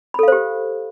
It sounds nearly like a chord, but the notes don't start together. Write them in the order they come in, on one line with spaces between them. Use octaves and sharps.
B5 A4 F5 C5 G4